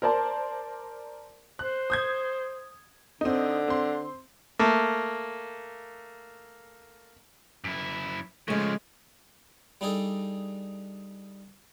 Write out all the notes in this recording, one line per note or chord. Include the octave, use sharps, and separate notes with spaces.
A#4 C5 D5 A5 C6
C5 F#6
D#6 G6 G#6
D3 C4 D#4
C4 C6
A3 A#3
F#2 E4
C#3 F3 G#3 A3
G3 D4 D#4 G#4 A4